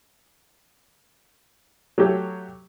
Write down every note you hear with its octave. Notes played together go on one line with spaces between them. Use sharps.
F#3 A3 G4 C#5